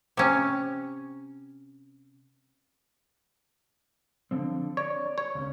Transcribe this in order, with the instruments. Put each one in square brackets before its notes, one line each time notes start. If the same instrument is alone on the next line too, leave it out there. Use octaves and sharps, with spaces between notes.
[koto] C3 C#4
[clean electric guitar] D3 F3 C4
[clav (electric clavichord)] C#5 [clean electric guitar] D5
[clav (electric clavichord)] C#5
[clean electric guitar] C#2 C#4